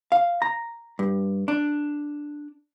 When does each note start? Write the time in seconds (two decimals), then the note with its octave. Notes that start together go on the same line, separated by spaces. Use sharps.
0.12 F5
0.42 A#5
0.99 G2
1.48 D4